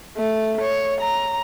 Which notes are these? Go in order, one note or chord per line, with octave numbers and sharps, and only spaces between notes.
A3
C#5
A#5